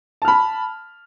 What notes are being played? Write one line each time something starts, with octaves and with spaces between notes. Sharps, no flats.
A5 B5 F6